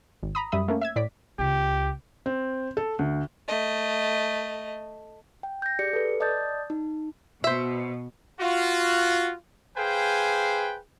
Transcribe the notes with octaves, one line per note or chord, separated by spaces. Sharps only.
G#1
A#5 B5 D#6
F#2 G3 E5 B5 D#6
A3 A#3 C#4
E5 E6 G#6
A2 D5 D6 B6
C#2 G4
C4
A4
D2
A3 D#5
G5
G6 A#6
G4 G#4 D5 C#7
A4 B4
D5 D#5 A5 D#6 G6 A6
D#4
B2 C5 E5
F4 F#4
G#4 B4 C5 F5 G5 G#5